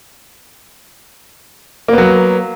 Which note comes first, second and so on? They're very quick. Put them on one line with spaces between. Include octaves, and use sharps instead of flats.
A#3 B3 F#3